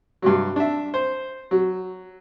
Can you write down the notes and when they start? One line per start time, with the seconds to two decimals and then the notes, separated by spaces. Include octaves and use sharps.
0.22 G2 C3 F#3
0.56 D4 E5
0.94 C5
1.51 F#3